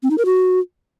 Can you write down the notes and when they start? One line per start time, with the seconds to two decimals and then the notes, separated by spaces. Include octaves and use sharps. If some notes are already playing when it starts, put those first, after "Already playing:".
0.03 C4
0.10 D#4
0.18 A#4
0.25 F#4